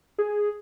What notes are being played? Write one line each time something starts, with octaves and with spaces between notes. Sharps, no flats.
G#4